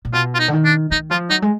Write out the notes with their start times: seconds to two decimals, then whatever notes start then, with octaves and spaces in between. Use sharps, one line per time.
0.05 A#2
0.13 B2 F4
0.35 F4
0.39 D#4
0.48 D3
0.53 D#3
0.65 D4
0.91 D#3 D#4
1.11 F3 F4
1.30 F#3 D#4
1.42 G#3